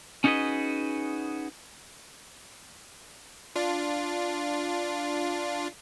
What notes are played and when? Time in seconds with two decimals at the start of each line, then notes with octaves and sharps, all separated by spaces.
0.24 C#4 D#4 F#4 G#4 B4 D#5
3.56 D4 F4